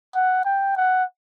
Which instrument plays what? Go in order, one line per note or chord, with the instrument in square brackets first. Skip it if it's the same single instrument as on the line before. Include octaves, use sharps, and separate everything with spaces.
[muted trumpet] F#5
G5
F#5